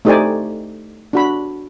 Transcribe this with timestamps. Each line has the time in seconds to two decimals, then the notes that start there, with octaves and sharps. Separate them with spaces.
0.05 A3 D#4 G4 C5 D5 G#5
1.13 D4 F#4 B5